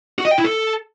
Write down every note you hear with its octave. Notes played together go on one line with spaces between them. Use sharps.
F#4
D#5
G5
E4
A4